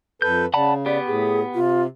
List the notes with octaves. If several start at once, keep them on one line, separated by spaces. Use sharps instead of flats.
F2 A4 B4 G6
C#3 D5 F#5 A5 B5
B3 G4 D5
A2 G#4
C3 F4